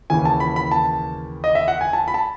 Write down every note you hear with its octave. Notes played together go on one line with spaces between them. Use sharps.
D#2 C#3 E3 G#5
A5
B5
B5
A5
D#5
E5
F#5
G#5
A5
B5
A5